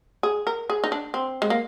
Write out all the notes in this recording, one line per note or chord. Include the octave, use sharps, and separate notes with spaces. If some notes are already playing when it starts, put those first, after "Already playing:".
G#4
A#4
G#4
D#4
D4
C4
G#3
A#3